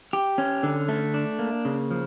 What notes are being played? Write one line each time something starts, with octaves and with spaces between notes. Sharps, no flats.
G4
C#4
D3
A3
D4
A#3
C#3
F3